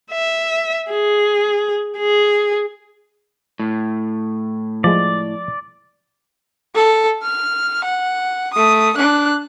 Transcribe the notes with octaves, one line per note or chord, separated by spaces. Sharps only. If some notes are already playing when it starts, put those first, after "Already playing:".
E5
G#4
G#4
A2
F3 G#3 D5
A4
F6
F#5
A3 D#6
D4 F#6